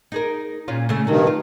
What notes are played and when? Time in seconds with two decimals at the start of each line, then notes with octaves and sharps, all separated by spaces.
0.12 D#4 G#4 A#4
0.68 A#2 C#4 F4
0.89 C#3 A3
1.07 G2 C3 D#3 F#3
1.27 F4